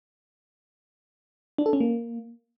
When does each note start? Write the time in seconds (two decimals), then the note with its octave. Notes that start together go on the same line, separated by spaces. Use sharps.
1.58 D4
1.66 A4
1.73 C#4
1.80 A#3